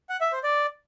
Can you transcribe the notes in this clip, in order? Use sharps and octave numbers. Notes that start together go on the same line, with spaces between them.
F#5
E5
C5
D5